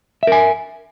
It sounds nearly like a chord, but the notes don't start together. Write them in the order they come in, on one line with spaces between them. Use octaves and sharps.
E5 A#4 G#5